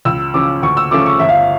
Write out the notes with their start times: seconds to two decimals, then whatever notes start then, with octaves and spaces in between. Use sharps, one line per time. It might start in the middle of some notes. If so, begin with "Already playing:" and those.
0.05 C#2 E6
0.34 C#3 F3 C#4 D6
0.62 D2 C#6
0.77 E6
0.91 C#3 F3 A3 C#4 D6
1.06 C#6
1.19 G1 E5
1.29 F5
1.37 E5